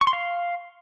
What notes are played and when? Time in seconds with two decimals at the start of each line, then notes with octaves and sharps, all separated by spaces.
0.01 C#6
0.07 C6
0.13 F5